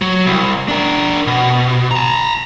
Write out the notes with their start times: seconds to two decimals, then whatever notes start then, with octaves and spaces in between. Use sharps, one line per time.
0.02 F#3
0.26 C2
0.69 D4 A#4
1.27 B2
1.91 A5 A#5